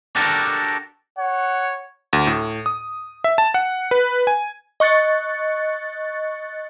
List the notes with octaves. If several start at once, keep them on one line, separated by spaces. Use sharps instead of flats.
D4 F#4 G4 A4 A#4
C#5 F#5
D2
A2
D#6
E5
A5
F#5
B4
G#5
D#5 C#6 F#6 A6 C#7